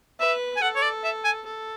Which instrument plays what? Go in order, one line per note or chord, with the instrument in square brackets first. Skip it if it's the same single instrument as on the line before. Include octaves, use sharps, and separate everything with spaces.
[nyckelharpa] B4 [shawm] E5
[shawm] G#5
[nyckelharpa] A4 [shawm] F#5
[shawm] C#5
D5
E5
G#5
[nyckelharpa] A4